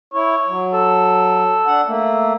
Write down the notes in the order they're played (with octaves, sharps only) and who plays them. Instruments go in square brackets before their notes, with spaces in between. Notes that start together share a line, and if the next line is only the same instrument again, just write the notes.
[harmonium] E4 [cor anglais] C#5
[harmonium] F#3
[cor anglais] A4
[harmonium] D4 F#5
A3 A#3